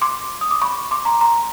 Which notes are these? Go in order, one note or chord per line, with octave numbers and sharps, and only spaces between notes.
C6 D6
D#6
D6
B5 C#6
C6 D6
A#5 C6
A#5 C6